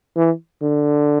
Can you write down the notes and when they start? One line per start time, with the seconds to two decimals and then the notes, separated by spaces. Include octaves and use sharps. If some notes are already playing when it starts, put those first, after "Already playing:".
0.17 E3
0.62 D3